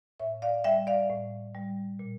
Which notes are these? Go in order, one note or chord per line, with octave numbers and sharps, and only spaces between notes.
A2 C#5 E5
D5 F5
G3 E5 G5
D5 F5
A2
G3
A#2